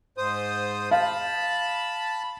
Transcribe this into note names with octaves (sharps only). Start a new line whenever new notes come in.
G#2 C5 D#6
F5 A5 B5